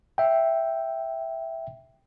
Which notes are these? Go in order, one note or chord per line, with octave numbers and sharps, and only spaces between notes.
E5 G5